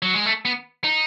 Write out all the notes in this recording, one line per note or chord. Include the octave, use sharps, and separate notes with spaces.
F#3
G#3
A3
B3
D#4